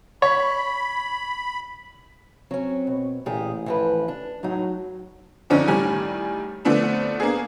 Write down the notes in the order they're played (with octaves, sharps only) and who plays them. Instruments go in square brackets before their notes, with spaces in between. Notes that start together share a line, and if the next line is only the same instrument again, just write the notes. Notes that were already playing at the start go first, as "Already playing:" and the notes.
[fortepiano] C#5 [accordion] B5
[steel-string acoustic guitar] F#3 C#4 [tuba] C4
[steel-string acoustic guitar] B2
[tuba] A1 [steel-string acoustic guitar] A#2 G4 G#4
[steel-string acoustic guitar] E3 F3 B4
D4
[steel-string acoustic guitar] A2 D#4 [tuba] F#3
[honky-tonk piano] F2 D3 F3 C#4 D#4
A2 D#3 G3 G#5
D3 F3 A3 B3 C4 D4
A#3 B3 D4 G#4